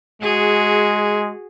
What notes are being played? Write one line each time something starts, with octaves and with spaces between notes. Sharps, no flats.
G#3 F#4 G#4